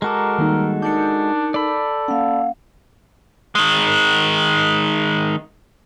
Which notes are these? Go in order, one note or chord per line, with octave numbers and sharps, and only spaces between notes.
G#3 F#4 A4 A#4 A5 A#5 D6
D#3 G3 A#3 D#4
D4 D#4 A#4 G6 C#7
A4 D5 B5
A#3 C#4 F5 F#5
D#3 G#3